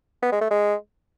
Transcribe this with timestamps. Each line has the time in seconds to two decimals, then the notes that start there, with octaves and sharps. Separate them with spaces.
0.23 B3
0.32 G#3
0.41 A3
0.51 G#3